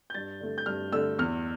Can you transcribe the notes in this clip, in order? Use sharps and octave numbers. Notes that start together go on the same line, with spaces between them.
G6
G2 A6
D3 A3
G6
G2 F6
D3 A3 E6
E2 F6